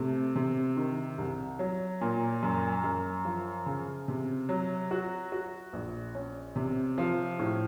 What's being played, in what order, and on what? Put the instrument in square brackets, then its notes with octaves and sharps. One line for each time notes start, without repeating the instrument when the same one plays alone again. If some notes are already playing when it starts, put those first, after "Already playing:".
Already playing: [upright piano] C3 A3
C3
D#3
C2
F#3
A#2
F#2
F#2
F3
C#3
C3
F#3
F#4
F#4
A#1
C#4
C3
F3
A2